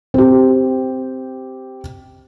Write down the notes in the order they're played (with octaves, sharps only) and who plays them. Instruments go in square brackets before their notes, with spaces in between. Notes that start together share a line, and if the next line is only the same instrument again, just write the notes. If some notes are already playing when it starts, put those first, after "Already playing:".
[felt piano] C4 G4